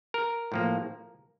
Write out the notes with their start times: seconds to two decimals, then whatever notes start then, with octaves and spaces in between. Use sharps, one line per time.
0.14 A#4
0.52 A2 F3 A#3